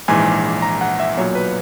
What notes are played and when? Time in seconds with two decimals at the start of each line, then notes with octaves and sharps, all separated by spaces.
0.08 A#1 G#2 E3 G#5
0.62 A#5
0.81 F#5
1.00 E5
1.17 B1 A#2 F#3 C#5
1.35 B4